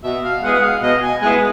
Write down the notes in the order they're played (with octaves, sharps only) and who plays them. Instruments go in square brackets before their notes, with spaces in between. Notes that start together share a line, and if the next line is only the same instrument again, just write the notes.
[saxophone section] B2 [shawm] E5
[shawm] F5
[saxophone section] G#3 B3 E4 G#4 [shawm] F#5
[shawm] F#5
F5
[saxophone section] B2 [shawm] D#5
[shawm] G#5
[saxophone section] G#3 B3 E4 G#4 [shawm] G#5